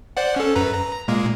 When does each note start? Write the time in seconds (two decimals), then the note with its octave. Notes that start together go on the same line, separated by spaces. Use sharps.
0.17 C5 D5 F#5
0.36 C#4 A4
0.55 F#2 B4 A#5
0.74 A#5
1.08 A#2 G#3 A#3